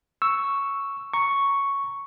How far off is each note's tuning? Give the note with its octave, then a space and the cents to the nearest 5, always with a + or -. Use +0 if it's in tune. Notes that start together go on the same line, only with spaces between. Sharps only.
C#6 +0 E6 +0
A#5 +0 C#6 +0